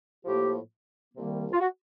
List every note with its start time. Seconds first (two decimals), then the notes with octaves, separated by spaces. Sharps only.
0.25 A2 F3 A#3 G4
1.14 C2 C3 D#3 G3 A#3
1.51 F4
1.60 F#4